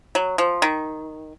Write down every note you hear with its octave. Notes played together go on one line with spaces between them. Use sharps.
F#3
F3
D#3